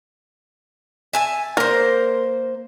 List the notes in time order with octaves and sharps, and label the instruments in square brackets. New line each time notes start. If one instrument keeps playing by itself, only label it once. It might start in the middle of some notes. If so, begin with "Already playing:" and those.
[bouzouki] E5 G#5 A5
[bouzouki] A#3 C5 [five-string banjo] A#4